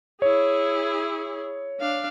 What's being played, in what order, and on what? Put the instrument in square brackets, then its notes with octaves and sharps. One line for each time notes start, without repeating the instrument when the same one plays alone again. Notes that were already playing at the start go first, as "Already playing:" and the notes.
[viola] E4 G#4 [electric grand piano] C#5
[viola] D4 F5